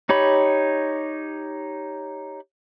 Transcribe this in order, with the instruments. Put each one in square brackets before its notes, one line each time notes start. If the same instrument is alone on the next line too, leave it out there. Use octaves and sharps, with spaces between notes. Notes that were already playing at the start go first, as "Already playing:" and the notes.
[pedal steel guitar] D#4 G4 C#5 B5